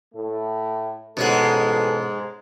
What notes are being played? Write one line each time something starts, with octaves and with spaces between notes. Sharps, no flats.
A2 A3
A1 G#2 B2 G#3 C#4 A4 F#5